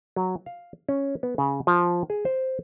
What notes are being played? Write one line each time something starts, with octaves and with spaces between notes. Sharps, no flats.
F#3
F5
C#4
B3
C#3
F3
G#4
C5